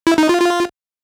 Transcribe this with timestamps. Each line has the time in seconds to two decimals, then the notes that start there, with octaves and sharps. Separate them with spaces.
0.07 E4
0.18 D#4
0.29 F4
0.41 F4